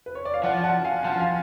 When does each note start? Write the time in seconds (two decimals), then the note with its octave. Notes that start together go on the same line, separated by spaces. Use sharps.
0.06 B4
0.15 C#5
0.25 D5
0.34 F5
0.43 F3 D5 F#5
0.64 F#5 A5
0.84 F5 G#5
1.05 F3 F#5 A5
1.20 F5 G#5